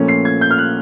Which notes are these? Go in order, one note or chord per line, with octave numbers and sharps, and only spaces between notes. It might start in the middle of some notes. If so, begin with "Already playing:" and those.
Already playing: A#2 F3 A3 C#4
C7
G#6
G6
F6
F#6